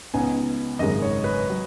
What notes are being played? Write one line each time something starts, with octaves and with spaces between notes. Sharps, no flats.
C#2 C#3 B3 D#4 G#5
G#1 F#2 C#3 G#3 D#4 D#5
C#5
B4
F#3